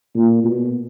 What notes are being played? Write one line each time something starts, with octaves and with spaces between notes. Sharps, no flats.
A#2
B2